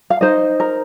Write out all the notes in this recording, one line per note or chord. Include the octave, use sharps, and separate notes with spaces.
F5
D#4 C5 D#5
A#4